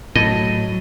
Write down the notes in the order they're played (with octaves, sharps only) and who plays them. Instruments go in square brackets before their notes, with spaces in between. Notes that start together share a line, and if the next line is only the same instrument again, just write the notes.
[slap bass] A2 [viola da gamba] F#3 [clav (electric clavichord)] D#5